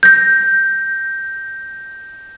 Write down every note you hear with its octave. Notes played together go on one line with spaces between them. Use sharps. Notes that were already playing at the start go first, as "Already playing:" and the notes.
G6 A#6